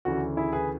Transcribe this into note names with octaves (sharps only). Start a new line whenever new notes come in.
D2 C#3 E3 F#4
E4 G#4
G#4 B4